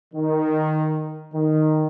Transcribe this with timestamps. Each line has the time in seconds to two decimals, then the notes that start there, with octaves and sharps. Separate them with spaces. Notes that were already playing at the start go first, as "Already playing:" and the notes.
0.13 D#3
1.33 D#3